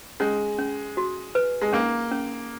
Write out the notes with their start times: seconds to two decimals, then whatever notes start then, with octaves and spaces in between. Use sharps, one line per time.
0.20 G#3 C#4
0.58 C#4
0.97 F#4
1.35 B4
1.62 G#3
1.73 A#3 C#4
2.11 C#4